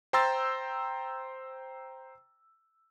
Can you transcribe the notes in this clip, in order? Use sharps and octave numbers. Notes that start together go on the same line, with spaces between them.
C5 G5 A#5 C6 E6 A6